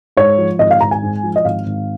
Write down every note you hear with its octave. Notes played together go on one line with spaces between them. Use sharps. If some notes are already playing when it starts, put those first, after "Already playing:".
G#2 C#5
F3
G#1 D#5
F5
G#1 A#5
G#5
G#2
F3
D#5
G#1 F5
G#1